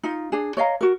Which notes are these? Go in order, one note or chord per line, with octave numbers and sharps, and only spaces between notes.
D#4 F4
D4 G#4
C#5 D#5 F5 A#5
F#4 A#4